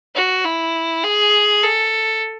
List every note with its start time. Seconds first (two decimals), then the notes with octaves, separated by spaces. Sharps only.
0.15 F#4
0.44 E4
1.03 G#4
1.62 A4